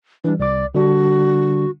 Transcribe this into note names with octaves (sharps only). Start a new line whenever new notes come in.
E3 G3 D4
C2 D5 D6
D3 G3 D4 F#4